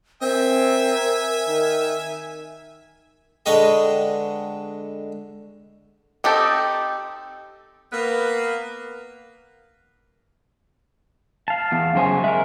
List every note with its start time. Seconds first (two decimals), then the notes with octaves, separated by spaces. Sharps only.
0.22 C4 A#4 E5 G#5
1.48 D#3
3.46 D3 G#3 B4 C#5 D#5 G5
6.24 C4 D#4 G4 A4
7.93 A#3 B3 B4
11.48 F5 A5
11.72 E2
11.95 F#2 C#3 C5 G#5
12.24 G#3 A#4 E5